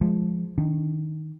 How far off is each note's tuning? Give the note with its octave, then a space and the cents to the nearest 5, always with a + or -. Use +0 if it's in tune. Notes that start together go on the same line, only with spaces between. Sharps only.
F3 +0 G#3 +0
D#3 +0 D4 -25